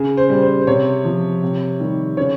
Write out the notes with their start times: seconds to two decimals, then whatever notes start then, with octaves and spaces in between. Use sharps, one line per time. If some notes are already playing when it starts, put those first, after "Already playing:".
Already playing: C#3 G#4
0.17 C5
0.29 G3
0.42 C5
0.62 C5
0.67 C3 C#5
1.05 F3
1.42 C3
1.80 D#3 G3
2.17 C#3 C#5